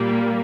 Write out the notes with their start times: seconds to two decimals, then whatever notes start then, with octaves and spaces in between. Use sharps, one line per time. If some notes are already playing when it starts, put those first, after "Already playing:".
Already playing: A#2 G3 A#3